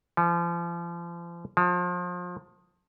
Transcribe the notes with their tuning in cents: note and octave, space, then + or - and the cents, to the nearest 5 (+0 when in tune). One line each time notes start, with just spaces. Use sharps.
F3 -35
F3 +30